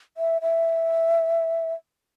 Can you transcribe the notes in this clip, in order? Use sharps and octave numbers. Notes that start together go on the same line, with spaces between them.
E5
E5